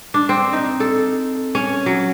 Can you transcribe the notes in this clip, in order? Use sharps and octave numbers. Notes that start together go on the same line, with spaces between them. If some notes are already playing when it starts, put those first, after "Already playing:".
D4
C4
D#4
A4
C#4
F#3